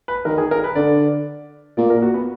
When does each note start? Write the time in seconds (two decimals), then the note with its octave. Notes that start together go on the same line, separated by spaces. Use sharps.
0.08 B4
0.25 D#3 A#4
0.38 G#4
0.51 A#4
0.64 B4
0.75 D3 D5
1.77 A#2 D5
1.90 A#4
2.02 F#4
2.14 B3